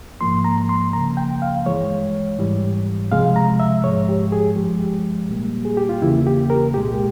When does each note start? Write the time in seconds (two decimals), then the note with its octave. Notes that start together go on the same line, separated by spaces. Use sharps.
0.21 G#2 F3 A#3 C6
0.45 A#5
0.69 C6
0.93 C#2 C#3 F3 A#3 A#5
1.17 G5
1.42 F5
1.66 G2 E3 G#3 C#5
2.38 G#2 E3 G3
3.12 C#2 C3 F3 G#3 F5
3.36 A#5
3.60 E5
3.84 G#2 F3 G#3 C#5
4.09 G4
4.32 G#4
4.56 G2 F3 G#3 G4
5.29 A#2 G3 A#3
5.65 G#4
5.77 G4
5.89 F4
6.02 E2 C#3 E3 A#3 E4
6.27 G4
6.50 A#4
6.74 C2 A#2 G#3 G4